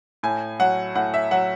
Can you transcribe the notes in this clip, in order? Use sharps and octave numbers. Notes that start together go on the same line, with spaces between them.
A2 G#5
F#3 F#5
A2 F#5
E5
F#3 F#5